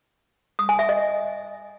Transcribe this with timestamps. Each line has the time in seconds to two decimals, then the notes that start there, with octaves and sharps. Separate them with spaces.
0.59 D#6
0.69 G#5
0.79 E5
0.89 D#5